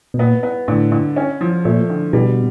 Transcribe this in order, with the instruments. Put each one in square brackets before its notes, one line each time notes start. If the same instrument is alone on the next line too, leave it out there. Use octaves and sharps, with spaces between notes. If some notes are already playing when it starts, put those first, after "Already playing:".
[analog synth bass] B2
[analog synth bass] A#2 [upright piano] B3
[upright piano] B3
[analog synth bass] A2 [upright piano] D3
[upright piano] D3
C#4
F3
[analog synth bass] A#2 [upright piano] A3
[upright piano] D3
[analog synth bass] B2 [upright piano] G3